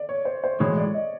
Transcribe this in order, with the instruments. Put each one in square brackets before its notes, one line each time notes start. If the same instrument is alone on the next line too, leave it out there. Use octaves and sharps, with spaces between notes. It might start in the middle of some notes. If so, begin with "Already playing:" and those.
Already playing: [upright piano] D5
C#5
C5
C5
[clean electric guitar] B1 A2 E3 G#3 [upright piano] C#5
[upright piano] D5
D#5